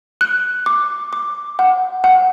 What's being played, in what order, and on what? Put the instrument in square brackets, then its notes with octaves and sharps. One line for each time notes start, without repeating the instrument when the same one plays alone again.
[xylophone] F#6
D6
D6
F#5
F#5